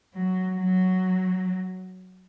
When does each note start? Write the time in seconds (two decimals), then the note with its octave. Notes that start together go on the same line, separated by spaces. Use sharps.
0.14 F#3
0.57 F#3